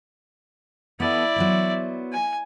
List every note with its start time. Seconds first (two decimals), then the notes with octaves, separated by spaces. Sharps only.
1.00 B3 E4 A4 D5
1.36 F#3 B3 C5
2.13 G#5